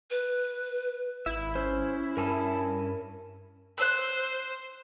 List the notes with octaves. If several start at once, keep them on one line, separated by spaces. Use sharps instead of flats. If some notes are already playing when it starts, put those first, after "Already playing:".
B4
G#1 E4 E5
C#4 C5
G2 A#4 G#5 A5
C5 E6 F#6